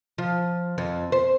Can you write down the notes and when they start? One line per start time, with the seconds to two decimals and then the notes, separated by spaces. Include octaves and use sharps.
0.18 F3
0.78 F2
1.12 C5